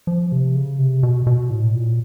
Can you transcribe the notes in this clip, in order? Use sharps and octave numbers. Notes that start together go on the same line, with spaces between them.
F3
C3
C#3
C3
B2
B2
A2
A#2